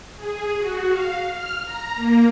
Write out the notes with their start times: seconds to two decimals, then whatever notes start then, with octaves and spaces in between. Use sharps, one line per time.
0.17 G#4
0.58 F#4
0.89 F5
1.31 F6
1.65 A#5
1.95 A#3